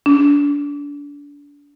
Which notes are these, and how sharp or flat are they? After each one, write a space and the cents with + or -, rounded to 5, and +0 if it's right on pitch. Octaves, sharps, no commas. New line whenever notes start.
D4 -30